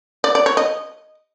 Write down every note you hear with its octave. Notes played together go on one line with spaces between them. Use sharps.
D5
D5
C#5
D#5